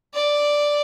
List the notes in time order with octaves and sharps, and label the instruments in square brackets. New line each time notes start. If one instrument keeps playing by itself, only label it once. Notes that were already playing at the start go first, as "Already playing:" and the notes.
[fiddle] D5